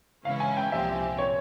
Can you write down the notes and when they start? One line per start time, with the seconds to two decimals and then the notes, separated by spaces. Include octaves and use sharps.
0.25 C#3 E3 G#3 C#4 E4 F5
0.40 G#5
0.57 G5
0.72 C2 A#2 F3 C4 G4 E5
1.18 C#5